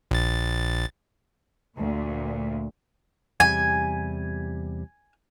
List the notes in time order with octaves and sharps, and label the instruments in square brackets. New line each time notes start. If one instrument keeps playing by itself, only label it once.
[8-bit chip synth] A#1 A6
[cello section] D2 A#2
[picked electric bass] E2 C3 G3 [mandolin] G#5